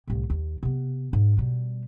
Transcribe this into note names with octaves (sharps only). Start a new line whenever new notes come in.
C2 A2
D#2
C3 B3
G#2
B2 G3